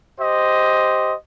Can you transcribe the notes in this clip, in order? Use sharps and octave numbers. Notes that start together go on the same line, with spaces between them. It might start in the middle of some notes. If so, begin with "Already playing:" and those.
G4 C5 D#5